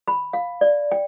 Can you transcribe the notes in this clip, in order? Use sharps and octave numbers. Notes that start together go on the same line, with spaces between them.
B5
F5
D5
G5